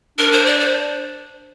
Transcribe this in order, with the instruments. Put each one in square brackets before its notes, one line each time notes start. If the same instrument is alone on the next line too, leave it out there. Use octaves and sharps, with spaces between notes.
[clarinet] D4 [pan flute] A#4
[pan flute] C5
D5
C5